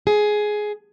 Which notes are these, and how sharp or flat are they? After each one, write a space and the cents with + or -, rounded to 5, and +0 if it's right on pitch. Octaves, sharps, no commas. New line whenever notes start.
G#4 +10